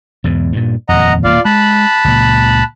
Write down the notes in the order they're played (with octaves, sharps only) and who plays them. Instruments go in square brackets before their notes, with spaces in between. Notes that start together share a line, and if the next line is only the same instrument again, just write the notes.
[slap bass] E2 G#2 B2
G2 A#2
[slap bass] D#1 F2 [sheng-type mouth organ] D#5 F#5 A#5
[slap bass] D#1 A#3 [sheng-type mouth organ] F4 D5 F5
[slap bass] G#3 [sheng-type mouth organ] A5 B5 F#6
[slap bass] C#2 A#2